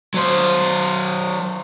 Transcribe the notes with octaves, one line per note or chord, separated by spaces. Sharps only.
F#3 C5